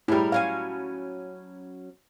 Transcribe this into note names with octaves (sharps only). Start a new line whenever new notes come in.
A2 G3 E4 G#4 A#4
F#3 C#4 F5 G#5